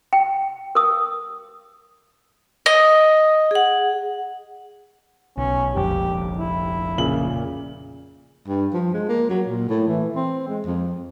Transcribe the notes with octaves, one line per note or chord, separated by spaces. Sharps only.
G5
A#4 D#6
D#5
G#4 F#5
B1 C#4
F1 A#1 F2 G4
E4
A#2 C#3 F#7
G2
F3
G#3
A#3
F#3
A#2
A2
E3
C4
G#3
F2